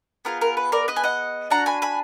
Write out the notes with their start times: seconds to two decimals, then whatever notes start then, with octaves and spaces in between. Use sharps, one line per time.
0.25 B3 F4 G#4 A#4
0.41 A#4
0.57 B4
0.72 A#4 D5
0.88 B4 D#5
0.96 G#5
1.03 D#5 F#5
1.50 D4 F#4 F#5 A#5
1.66 G#5 B5
1.82 G#5 B5